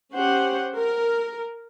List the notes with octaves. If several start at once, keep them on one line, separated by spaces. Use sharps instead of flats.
C#4 G4 C5 F#5
A#4